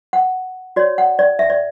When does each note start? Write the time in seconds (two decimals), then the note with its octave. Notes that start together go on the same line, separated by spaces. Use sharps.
0.13 F#5
0.76 F#4 C#5 D5
0.98 F#5
1.19 D5
1.39 E5
1.50 D5